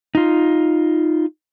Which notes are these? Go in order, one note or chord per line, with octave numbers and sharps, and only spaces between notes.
D#4 F4